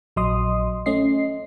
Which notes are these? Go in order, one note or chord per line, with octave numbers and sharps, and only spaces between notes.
A#1 F#3 D#5 C6 D#6
A3 C#4 D#5 C7